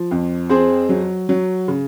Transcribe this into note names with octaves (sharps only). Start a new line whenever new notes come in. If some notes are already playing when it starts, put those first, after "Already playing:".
Already playing: F3
F2
C4 G#4 C5
F#3
F#3
C#3